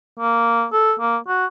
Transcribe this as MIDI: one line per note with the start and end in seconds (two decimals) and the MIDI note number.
0.20 0.65 58
0.72 0.94 69
1.00 1.17 58
1.28 1.46 66